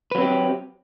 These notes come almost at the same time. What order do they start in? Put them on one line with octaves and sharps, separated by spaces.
B4 F#3 C4 G4